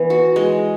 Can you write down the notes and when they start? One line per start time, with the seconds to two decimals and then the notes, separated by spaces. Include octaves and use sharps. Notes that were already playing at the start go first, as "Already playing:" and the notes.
Already playing: E3 B3
0.10 F#4
0.36 G#3